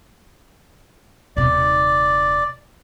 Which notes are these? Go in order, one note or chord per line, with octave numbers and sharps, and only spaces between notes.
D#1 C3 D5